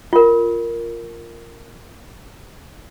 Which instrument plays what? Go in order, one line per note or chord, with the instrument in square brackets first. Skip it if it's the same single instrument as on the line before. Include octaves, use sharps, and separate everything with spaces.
[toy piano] F4 A#4